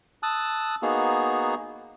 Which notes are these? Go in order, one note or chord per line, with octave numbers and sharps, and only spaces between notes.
A5 D#6 E6 F#6
A#3 B3 D#4 F#4 G#4